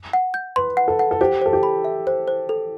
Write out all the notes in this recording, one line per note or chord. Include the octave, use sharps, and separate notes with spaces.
F#5
G6
B4 C6
F#5
A4
F#5
A4
G4 C5
A4 C5
G4
B5
E5
C5
C5
A4